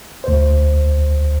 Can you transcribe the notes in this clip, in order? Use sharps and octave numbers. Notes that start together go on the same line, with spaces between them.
D2 C5